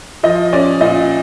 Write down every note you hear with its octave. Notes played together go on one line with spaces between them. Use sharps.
F3 D#5
C#4 D5
A#2 D#5